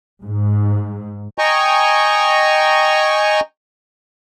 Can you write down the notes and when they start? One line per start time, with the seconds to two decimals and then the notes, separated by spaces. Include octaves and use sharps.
0.23 G#2
1.38 D#5 G5 G#5 A#5 C#6